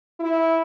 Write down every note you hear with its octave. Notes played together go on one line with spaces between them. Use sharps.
E4